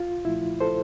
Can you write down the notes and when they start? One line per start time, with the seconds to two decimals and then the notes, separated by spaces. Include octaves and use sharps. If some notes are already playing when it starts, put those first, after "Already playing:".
Already playing: C2 F4
0.25 A#2 F3 A3 E4
0.61 A4 C5